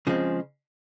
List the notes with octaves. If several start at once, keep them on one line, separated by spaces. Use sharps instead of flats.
C#3 F3 G#3 C4